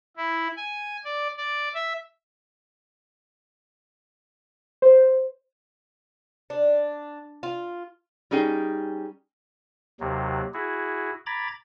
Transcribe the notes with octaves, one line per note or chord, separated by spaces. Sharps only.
E4
G#5
D5
D5
E5
C5
D4
F4
G3 C#4 D#4 G#4 G5
D#2 C3 F#3
E4 F#4 G#4
A#5 B5 D6 G#6 A6